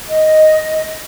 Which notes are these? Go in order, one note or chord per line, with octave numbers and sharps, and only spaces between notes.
D#5